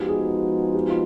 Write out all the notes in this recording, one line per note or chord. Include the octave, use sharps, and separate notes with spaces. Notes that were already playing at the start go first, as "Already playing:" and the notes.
Already playing: F3 G#3 B3 D#4 F#4 G4
G#4
G4
F4